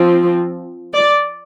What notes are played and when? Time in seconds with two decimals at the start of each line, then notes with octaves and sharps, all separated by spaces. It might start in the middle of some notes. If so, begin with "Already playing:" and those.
Already playing: F3 C4
0.93 D5